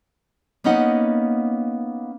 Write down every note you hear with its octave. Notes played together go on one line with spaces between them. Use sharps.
A#3 B3 C#4 D#4 D#5 F#5